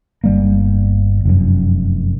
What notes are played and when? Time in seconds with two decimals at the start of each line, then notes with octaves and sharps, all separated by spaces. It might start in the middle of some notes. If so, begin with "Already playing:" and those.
0.24 G1 G3 A#3
1.25 F1 F#2